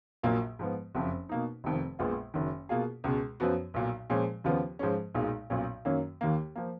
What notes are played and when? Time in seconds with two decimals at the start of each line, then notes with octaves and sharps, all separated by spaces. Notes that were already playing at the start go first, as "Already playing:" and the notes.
0.23 A#1 A#2 F#3 A#3 F4
0.59 G#2 F3 G#3 B3
0.95 F#1 F2 F3
1.29 B2 A#3 D#4
1.64 F1 F2 D#3
1.99 A#1 A#2 G#3 B3 F4
2.34 F#1 F#2 D#3
2.69 B2 A#3 F4 G#4
3.04 C#2 B2 G#3
3.40 F#2 F3 B3 F#4
3.74 B1 A#2 F#3
4.10 A#2 F3 G#3 C#4
4.44 D#2 C#3 F3 B3 F4
4.79 G#2 F3 G#3 C#4
5.14 B1 A#2 G#3 D#4
5.50 B1 A#2 F#3 C#4
5.85 F#2 D#3 F#3 A#3 C#4
6.21 D#2 D#3 A#3
6.56 F3 A#3